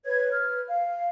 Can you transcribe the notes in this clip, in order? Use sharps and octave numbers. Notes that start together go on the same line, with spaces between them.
B4 C#5 G#6
B4 F6
F5